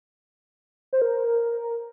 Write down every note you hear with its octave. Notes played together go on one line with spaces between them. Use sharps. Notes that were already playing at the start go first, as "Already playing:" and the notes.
C5
A#4